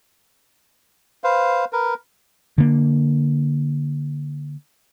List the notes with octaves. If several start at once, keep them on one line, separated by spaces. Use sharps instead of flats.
B4 C5 F5
A#4 B4
D3 A#3